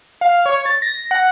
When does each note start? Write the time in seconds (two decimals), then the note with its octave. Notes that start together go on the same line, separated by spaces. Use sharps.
0.21 F5
0.46 C#5
0.66 A6
0.82 A#6
1.11 F#5